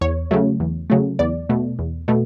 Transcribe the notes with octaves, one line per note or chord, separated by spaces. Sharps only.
E2 C#5
C#3 F#3 A3
E2
C#3 F#3 A3
E2 D5
B2 A3
E2
B2 A3